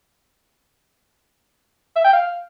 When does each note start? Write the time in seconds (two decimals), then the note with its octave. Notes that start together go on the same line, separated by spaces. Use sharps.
1.96 E5
2.04 G5
2.13 F5